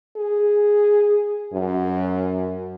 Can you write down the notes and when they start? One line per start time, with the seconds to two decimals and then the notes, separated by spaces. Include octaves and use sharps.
0.17 G#4
1.54 F#2